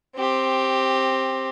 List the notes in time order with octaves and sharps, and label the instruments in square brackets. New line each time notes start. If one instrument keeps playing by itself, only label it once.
[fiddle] C4 G4